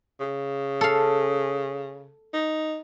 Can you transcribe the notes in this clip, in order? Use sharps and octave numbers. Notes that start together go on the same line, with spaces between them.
C#3
A4 F5
D#4